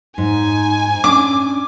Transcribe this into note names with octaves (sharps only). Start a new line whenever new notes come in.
G#2 D#4 G#5
C#4 D4 D6